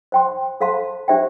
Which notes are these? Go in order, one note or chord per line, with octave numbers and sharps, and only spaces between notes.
C5 G5 C6
A4 C5 F5 A5 C6
D4 G4 C5 E5 G5